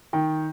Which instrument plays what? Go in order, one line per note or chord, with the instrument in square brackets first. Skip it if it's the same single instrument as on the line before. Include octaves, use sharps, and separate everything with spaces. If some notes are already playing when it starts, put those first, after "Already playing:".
[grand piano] D#3 [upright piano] G5